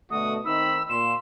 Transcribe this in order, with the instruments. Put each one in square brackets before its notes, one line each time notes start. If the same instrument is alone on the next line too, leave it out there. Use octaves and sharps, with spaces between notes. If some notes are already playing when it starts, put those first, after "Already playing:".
[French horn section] B2 D3 A3 [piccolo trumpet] F#4 [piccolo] D#6
[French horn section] D#3 C4 D#4 [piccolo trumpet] B5 [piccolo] E6
[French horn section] A#2 [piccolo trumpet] C6 [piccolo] E7